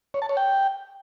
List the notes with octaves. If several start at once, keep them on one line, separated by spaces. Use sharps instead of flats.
C#5
A5
C#5
G5